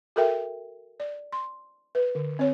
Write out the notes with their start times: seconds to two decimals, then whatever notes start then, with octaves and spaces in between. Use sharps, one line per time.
0.16 F#4 A4 A#4 E5 G5
1.00 D5
1.32 C6
1.95 B4
2.15 D3
2.39 C4 C#5